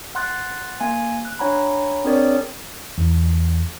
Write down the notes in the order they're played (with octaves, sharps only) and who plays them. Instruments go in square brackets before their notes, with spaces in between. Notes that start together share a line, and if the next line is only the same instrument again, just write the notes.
[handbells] F#5 C6 F#6 A6
A#3 G#5
F#6
D4 C#5 F#5 G#5 A#5 B5
C4 D4 G#4 A#4 C#5 D5
[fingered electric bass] E2